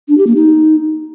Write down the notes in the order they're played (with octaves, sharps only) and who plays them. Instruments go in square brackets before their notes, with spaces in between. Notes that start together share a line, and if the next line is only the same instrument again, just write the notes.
[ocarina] D4
G4
A#3
D#4